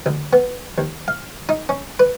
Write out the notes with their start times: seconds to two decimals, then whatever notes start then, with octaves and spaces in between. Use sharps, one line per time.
0.06 D2
0.33 B3
0.78 D#2
1.08 F5
1.49 D#4
1.69 C#4
1.99 B4